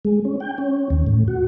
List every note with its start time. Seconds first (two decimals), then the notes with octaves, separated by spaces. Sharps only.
0.05 G#3
0.25 C#4
0.40 G5
0.58 C#4
0.90 D#2
1.07 A2
1.28 F#4